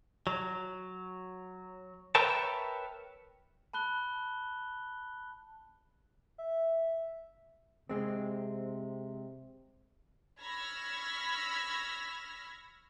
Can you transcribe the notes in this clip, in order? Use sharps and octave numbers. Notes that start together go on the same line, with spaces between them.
F#3
A#4 B4 C#5 E5 G5 A5
A5 B5 F#6 G7
E5
C3 G#3 C4
B5 C#6 E6 F6 G#6 A#6